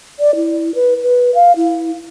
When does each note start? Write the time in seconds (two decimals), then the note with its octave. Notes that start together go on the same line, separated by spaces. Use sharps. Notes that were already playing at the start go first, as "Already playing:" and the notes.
0.20 D5
0.35 E4
0.75 B4
1.03 B4
1.35 F5
1.56 E4